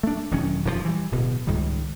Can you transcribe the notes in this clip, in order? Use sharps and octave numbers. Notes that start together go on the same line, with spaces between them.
A3 D4
E1 D#3 F#3 C#4
D#1 F2 A2 F3
E3 G3
D1 B2
C#2 G#2 D#3 G3